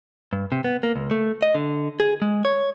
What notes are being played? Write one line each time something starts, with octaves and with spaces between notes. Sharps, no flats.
G2
C3
B3
A#3
C#2
A3
D#5
D3
G#4
G#3
C#5